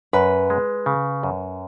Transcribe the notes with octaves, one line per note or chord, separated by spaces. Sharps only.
F#2 B4
G#3
C#3
F#2